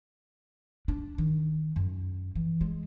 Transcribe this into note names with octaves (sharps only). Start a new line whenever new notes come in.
D4
D#3
F#2
E3
G#3